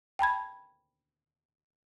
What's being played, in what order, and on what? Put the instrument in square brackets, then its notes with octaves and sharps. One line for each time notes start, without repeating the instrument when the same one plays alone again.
[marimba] G5 A5 B5 G#6